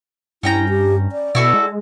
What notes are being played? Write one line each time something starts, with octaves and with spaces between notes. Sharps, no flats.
G2 C#4 E4 G5 A#5
G4
D5
B2 E4 F#4 A4
G#3